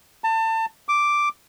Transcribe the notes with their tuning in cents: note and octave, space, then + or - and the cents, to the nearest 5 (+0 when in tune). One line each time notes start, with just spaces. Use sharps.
A5 +30
D6 +0